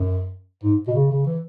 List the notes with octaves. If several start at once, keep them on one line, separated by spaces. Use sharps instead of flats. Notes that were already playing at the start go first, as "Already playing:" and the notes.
Already playing: F#2
G#2
B2
C#3
C#3
E3